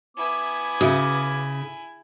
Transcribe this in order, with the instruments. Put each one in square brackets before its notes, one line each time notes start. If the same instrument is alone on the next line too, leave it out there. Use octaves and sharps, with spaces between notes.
[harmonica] B3 D6 [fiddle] E4 G#5
[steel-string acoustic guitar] C#3 [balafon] F#4 E5